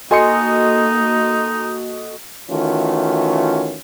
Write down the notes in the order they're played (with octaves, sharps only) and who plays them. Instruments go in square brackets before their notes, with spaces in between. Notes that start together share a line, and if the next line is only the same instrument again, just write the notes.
[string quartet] A#3 [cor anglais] D#4 [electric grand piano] F#4 A4 D#5 [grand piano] G#5 C6 C#7
[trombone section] D#3 E3 A3 C#4 F4 F#4